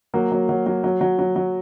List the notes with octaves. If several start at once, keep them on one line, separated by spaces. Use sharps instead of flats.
F#3 A#3
F#3
F#3
F#3
F#3
F#3
F#3
F#3